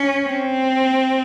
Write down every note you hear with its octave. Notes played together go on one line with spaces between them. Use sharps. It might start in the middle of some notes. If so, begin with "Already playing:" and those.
Already playing: C#4
C4